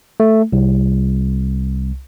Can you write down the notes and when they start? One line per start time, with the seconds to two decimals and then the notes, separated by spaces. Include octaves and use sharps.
0.20 A3
0.53 C2